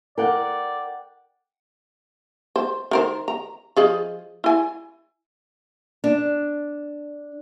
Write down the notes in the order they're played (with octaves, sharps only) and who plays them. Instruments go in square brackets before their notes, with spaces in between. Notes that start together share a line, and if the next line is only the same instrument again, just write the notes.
[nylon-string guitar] A#4 [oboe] D5 [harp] F#5 G5
[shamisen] C5
D#3 A#4 C5
A#5
F3 G#4 D#5
E4 G#5
[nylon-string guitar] D4